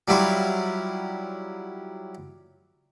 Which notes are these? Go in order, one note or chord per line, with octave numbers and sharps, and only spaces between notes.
F#3 G3 E4 F4